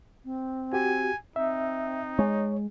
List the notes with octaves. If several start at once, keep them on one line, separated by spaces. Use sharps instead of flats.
C4
F#4 G4 G#5
C4 D#4 E5
G#3 C#5